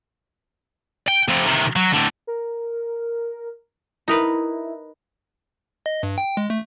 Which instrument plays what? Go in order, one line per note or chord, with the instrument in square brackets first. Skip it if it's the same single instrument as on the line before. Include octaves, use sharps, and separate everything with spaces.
[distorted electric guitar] G5
F2 C3
C3 D#3
F#3
A2 D3
[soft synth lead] A#4
[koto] D#4 A#4 B4 [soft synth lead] E4
[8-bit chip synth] D#5
G2
G5
G#3
A3